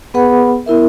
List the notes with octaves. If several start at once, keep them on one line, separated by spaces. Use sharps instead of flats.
B3 G#4 B4 F#5 B5
B3 E4 A#4 E5